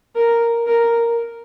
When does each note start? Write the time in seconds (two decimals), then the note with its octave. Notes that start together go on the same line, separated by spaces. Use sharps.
0.16 A#4
0.67 A#4